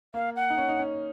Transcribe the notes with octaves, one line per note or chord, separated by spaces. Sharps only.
A#3 F5
F#5
D#4
C#4
D#4
C#4